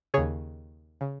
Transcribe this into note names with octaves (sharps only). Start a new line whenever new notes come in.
D#2 C#3 G#4 C#5
C#3